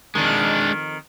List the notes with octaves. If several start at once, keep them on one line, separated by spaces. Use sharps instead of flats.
F2 D#3 G#3 D4